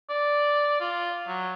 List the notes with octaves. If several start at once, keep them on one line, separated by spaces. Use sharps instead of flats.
D5
F4
F#3